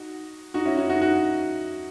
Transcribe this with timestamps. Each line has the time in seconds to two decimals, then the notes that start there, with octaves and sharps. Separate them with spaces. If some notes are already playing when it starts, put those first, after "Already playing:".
Already playing: D#4 F#4
0.54 D#4 F#4
0.66 C#4 E4
0.77 D#4 F#4
0.89 D#4 F#4
1.02 D#4 F#4